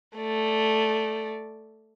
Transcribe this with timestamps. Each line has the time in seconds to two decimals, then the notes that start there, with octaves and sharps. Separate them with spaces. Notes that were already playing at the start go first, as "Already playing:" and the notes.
0.17 A3 D5